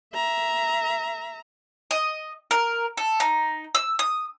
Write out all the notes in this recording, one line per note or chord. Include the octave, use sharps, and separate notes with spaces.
E5 A#5
D#5
A#4
A4
D#4
E6
D#6